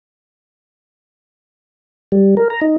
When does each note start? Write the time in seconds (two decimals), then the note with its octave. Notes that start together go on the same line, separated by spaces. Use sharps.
2.12 G3
2.37 A#4
2.50 A#5
2.61 D#4